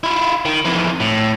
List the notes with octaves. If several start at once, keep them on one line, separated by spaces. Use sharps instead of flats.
E4 F4
D#3
F2 E3
A2